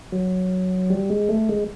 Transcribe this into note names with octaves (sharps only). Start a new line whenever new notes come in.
F#3
G3
G#3
A3
G#3